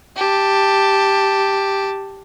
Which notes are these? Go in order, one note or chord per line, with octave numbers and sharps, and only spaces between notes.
G4 A5